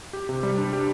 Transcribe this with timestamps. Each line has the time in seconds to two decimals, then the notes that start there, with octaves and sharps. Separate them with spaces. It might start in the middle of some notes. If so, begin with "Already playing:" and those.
0.13 G4
0.29 C3
0.43 G3
0.58 D4
0.73 G4